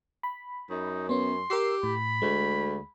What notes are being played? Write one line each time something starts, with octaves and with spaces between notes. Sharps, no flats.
B5
F#2 D#4
B3 C#4 C6
G4 A#4 E6 C7
A2 B5
D2 G#3